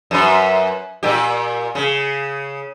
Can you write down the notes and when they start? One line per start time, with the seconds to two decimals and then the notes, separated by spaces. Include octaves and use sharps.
0.11 F#2 B4
1.03 A#2 G4
1.75 C#3